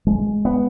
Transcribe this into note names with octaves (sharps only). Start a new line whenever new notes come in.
G#3
B3